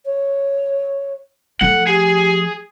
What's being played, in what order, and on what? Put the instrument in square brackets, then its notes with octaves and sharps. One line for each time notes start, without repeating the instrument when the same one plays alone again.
[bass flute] C#5
[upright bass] F3 A3 [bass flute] A4 [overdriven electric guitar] F#5
[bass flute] G4 [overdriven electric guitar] G#4